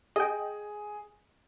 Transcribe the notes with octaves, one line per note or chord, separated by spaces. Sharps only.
G#4 D#5 G5